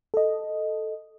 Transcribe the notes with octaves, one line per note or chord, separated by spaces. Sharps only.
A4 D#5